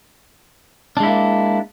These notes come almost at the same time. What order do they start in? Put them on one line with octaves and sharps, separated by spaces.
D4 G#3 E4 A#3